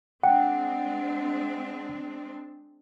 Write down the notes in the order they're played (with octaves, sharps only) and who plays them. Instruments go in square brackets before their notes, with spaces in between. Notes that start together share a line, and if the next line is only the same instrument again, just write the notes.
[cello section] G#3 C4 D4 [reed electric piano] F#5 [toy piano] G5